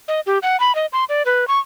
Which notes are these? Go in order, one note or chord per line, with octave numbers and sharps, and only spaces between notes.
D#5
G4
F#5
B5
D#5
C6
D5
B4
C#6